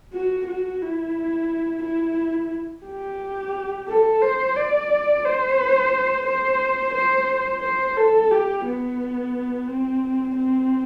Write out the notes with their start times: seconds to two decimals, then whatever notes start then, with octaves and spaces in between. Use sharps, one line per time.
0.14 F#4
0.47 F#4
0.82 E4
1.83 E4
2.87 G4
3.89 A4
4.22 C5
4.56 D5
5.25 C5
6.27 C5
6.94 C5
7.63 C5
7.97 A4
8.31 G4
8.65 B3
9.68 C4
10.35 C4